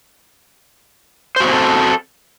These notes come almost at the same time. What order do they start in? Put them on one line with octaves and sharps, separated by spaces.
C5 F#4 C4 G#4 A4